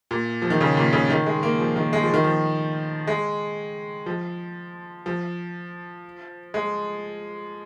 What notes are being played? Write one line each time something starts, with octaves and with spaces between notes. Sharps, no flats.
A#2
F3
D#3
C#3
A#2
C#3
D#3
G#3
A#3
F3
D#3
G#3
F3
D#3
F3
G#3
F3
F3
G#3